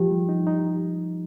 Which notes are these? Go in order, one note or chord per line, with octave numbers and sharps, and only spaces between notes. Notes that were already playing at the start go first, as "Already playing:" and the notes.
Already playing: F3 G4
G3
D#4
D#4